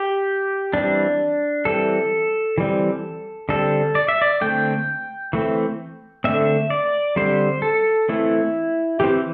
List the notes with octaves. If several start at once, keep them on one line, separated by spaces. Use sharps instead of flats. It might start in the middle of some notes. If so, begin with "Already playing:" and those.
Already playing: G4
E3 G3 C4 D4
E3 G3 C4 A4
E3 G3 C4
D3 G3 C4 A4
D5
E5
D5
D3 A3 C4 G5
E3 A3 C4
D3 A3 C4 E5
D5
D3 G3 C4 C5
A4
E3 A3 C4 E4
E3 C4 G4